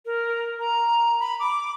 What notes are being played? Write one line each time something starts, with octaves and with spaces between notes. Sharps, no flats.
A#4
A#5
B5
D6